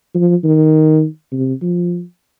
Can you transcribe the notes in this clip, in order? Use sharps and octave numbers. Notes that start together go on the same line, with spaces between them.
F3
D#3
C3
F3